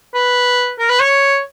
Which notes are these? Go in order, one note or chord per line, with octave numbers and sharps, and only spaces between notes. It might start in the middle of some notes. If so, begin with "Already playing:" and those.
B4
A#4
B4
C#5